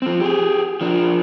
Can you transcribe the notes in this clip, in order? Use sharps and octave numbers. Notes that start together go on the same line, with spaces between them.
F3 C4
G4 G#4
F3 D4